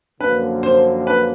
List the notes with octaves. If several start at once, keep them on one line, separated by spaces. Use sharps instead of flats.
F#2 D3 F3 A#3 B4
C5
B4